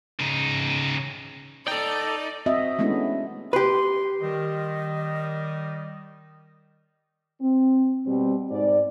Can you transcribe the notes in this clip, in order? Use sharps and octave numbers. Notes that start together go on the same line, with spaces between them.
C#3 D#4
D#4 A4 D5 G5
C4 F#4 D#5 E5
G#3 A3 B3 C#4 D4 E4
G4 B4 C6
D#3 G3 D#5
C4
B2 G3 C4
G#2 D5